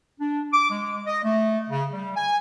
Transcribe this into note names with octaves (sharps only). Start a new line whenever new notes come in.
D4
D6
G#3
D#5
A3
C#3
G3
G#5